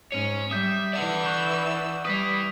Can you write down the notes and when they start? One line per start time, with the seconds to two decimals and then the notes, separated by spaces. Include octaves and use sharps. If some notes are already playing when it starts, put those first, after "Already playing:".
0.12 G#2 C#4 C#5 D#7
0.51 G3 E5 D#6 G6
0.93 E3 B4 D5 F#5 E6
1.26 C#6 F#6 G6
2.05 G3 B4 E5 D#6 B6